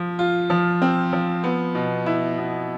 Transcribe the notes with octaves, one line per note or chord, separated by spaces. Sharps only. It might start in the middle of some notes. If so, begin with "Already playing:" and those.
Already playing: F3
F4
F3
C4
F3
B3
B2
E4
B2